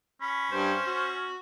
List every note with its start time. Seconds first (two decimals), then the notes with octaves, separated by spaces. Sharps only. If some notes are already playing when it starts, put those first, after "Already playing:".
0.21 C#4 B5
0.51 G2 C5
0.87 F#4